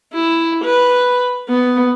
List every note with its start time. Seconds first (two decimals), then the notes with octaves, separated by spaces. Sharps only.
0.14 E4
0.64 B4
1.49 B3